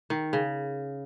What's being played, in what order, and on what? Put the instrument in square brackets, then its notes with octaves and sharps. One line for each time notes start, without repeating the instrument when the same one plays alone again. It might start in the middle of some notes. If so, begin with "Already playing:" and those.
[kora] D#3
C#3